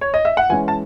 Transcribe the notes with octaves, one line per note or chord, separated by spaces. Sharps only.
C#5
D#5
E5
F#5
E3 G#3 C#4 G#5
A5